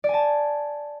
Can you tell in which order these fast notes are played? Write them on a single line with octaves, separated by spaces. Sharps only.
D5 G#5 A5